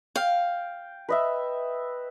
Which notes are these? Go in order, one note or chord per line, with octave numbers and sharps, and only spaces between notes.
F5 G5
B4 D#5 E5